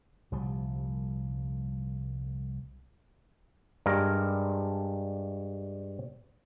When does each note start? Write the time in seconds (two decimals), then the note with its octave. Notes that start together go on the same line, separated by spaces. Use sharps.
0.32 C2 A#2 F3 G3
3.86 G2 G#3 A#4